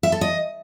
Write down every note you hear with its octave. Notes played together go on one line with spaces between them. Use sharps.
E5
A4
D#5